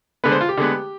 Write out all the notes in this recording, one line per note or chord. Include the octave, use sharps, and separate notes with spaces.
D3 G#3 B3 B4
C5
F4
G4
D3 G#3 B3